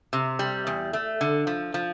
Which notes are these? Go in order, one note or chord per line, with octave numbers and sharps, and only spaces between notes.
C3
G3
E2
A3
D3
F3
F3